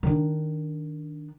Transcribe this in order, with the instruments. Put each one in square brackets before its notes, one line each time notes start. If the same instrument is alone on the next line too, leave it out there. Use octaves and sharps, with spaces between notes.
[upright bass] D#3 D4